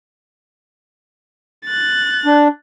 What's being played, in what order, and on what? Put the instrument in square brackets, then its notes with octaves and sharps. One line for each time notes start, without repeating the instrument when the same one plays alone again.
[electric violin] F#6 A6
[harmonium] D4